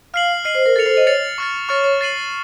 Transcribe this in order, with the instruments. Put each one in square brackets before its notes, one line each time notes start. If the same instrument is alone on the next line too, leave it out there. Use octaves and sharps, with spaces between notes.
[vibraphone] F5 [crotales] F6 C7 F#7
[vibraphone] D#5 [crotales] F6 C7 F#7
[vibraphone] C5
A#4
[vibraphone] A4 [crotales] A6 C#7 F7
[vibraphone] C5
D#5
[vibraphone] C#5 [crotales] A6 C#7 F7
[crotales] C#6 F6 A6
[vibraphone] C#5 [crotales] C#6 F6 A6
[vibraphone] C#5
[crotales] A6 C7 D#7 F#7